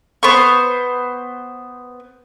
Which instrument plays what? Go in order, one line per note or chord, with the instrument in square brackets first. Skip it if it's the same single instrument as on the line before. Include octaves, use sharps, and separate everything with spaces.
[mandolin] B3 C5 C#6